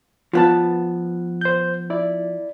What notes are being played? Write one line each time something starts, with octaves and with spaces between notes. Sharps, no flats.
F3 B3 F4 A5
C5 G6
E4 D5